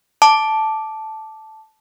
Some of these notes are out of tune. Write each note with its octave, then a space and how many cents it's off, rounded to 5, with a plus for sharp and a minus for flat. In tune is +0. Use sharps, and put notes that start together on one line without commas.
A5 -5 D6 +0